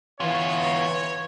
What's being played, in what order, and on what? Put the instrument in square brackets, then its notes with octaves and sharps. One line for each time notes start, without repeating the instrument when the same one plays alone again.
[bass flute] E3 [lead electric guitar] B3 F4 [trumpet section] C#5